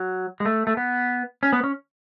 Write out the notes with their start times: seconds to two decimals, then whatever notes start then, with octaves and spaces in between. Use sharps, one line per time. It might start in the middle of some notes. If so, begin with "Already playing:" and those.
Already playing: F#3
0.40 G#3
0.45 A3
0.67 A3
0.77 B3
1.43 C#4
1.53 B3
1.64 C#4